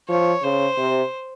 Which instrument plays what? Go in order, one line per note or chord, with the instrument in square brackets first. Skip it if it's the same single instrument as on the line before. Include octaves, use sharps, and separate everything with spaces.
[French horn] F3 [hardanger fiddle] C#5
[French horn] C#3 [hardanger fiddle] C5
[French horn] C3